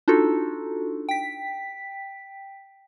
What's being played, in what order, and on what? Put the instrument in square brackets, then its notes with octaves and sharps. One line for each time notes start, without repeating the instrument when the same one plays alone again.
[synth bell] D4 D#4 F4 F#4 A4
G5 B6